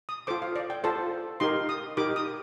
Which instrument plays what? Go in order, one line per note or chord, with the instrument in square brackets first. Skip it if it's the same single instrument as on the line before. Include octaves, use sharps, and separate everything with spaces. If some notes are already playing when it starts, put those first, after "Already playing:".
[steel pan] D#6
F4 A4 C5 D6
F5
D5
G5
F4 A4 C5 A5
D#4 G4 A#4 C6
D#6
D#4 G4 A#4 D6
D#6